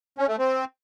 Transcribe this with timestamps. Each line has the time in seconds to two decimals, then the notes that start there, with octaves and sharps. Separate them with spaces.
0.18 C#4
0.28 A3
0.38 C4